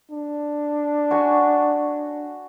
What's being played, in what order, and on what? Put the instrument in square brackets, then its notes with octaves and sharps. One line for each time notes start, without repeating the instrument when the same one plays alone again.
[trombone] D4
[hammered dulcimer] F#4 C#5 G#5